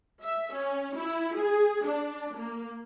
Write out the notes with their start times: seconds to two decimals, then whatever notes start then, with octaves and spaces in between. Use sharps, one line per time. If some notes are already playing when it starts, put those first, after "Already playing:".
0.23 E5
0.53 C#4
0.96 E4
1.35 G#4
1.85 D4
2.36 A#3